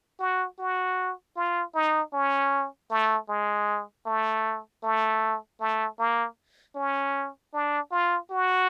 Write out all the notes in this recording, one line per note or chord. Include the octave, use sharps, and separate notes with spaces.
F#4
F#4
F4
D#4
C#4
A3
G#3
A3
A3
A3
A#3
C#4
D4
F4
F#4